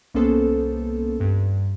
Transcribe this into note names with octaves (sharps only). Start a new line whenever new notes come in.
C2 A#3 B3 C#4 A4 C5
G2